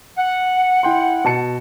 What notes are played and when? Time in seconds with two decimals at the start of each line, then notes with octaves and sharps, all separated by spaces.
0.17 F#5
0.83 E4 G5 C6
1.25 B2 A5 C#7